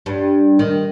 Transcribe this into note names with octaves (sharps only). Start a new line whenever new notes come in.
G2
D#3